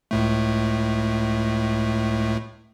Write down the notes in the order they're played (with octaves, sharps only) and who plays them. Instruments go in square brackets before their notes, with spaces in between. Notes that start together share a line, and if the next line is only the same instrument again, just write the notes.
[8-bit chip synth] C#2 A2 A3